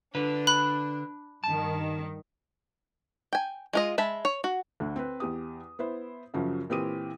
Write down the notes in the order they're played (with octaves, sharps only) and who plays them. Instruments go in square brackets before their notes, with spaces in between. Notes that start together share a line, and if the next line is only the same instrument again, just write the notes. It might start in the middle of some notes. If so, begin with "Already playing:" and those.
[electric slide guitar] D3 B4 [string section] D4
[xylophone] B5 F#6
[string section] G2 D#3 [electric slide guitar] A5
[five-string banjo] G5 G#5
G#3 F4 D#5
G#3 E5 A5 B5
C#5
F#4
[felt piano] D2 D3
C4 B4
E2 G4 D#6
B3 E4 C5
F#2 C#3 F3 F#3
A#2 E3 C4 G4 D#6 D#7